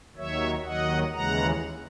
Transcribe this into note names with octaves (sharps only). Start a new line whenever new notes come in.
D#2 D#3 F#3 C#5 E5
D#2 D#3 F#3 D#5 F#5
D#2 C#3 E3 G#3 F#5 A#5